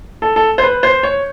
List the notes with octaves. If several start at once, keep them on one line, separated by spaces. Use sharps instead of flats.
A4
A4
C5
B4
C5
C#5